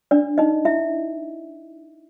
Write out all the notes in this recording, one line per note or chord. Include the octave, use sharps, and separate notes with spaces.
D4 D5
D#4 D#5
E4 E5